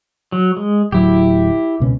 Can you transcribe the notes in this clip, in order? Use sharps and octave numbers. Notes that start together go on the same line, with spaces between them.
F#3
G#3
D1 F#3 E4 G4
C#2 B2 C#4